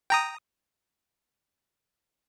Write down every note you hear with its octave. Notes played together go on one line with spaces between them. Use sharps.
G5 A#5 D#6